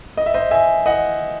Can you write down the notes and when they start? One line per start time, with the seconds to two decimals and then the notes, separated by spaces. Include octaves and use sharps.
0.17 D#5
0.26 E5
0.34 C5 D#5
0.51 E5 G#5
0.86 D#5 F#5